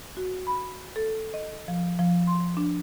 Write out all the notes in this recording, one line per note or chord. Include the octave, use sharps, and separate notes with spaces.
F#4
B5
A4
D#5
F3
F3
C6
D4